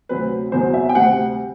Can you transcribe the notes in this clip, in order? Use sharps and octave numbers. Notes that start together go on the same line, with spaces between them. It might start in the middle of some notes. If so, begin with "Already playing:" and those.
D2 C3 F#3 C4 B4
F#1 E2 B2 F#3 C4 C5
E5
G5
D2 C3 G3 C4 F#5